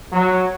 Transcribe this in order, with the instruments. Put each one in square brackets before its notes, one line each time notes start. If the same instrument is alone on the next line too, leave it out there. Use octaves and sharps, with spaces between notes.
[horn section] F#3